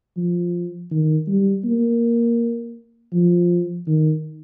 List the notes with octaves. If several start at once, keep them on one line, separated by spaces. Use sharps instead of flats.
F3
D#3
G3
A#3
F3
D#3